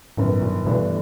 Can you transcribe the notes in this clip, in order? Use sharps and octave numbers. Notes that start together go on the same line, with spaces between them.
G1 F#2 A2 D#3
A#2
G1 G2 B2 E3 A3 D4